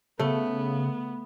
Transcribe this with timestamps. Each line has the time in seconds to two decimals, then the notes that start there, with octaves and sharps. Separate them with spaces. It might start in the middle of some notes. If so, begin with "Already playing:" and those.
0.19 C#3 A3 B3